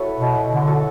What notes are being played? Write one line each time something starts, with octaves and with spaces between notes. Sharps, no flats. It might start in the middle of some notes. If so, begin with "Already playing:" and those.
Already playing: E4 F#4 A4 B4 C#5
B2
D3
F#4 A4